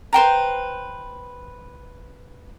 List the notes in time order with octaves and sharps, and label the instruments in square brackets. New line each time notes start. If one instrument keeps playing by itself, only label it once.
[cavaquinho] B4 C5 G5 A#5